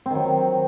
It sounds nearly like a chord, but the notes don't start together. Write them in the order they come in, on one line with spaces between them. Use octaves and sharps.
C4 D#3 F#3